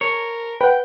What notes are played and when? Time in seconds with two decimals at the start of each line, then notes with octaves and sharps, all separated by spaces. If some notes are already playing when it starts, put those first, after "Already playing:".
0.01 A#4 C#5
0.61 B4 F#5 G5